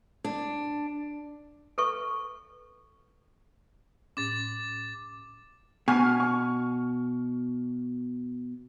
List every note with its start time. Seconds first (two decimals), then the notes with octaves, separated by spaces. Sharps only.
0.24 D4
1.78 A4 B4 C#6
4.17 A2 C#4 D6 A6
5.88 B2 G#5 C#6 F6
6.20 C#6